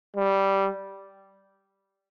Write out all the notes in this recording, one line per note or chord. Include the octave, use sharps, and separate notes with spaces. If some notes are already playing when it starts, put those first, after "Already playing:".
G3